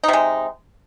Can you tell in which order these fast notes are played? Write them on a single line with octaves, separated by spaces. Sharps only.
D#4 C3 G#3